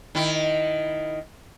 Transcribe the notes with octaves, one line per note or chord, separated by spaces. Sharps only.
D#3 E4